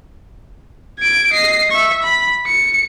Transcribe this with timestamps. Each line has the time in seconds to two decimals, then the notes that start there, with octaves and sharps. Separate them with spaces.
0.99 G#6 D7
1.32 D#5 C7
1.71 E5 C#6
2.02 B5
2.47 C#7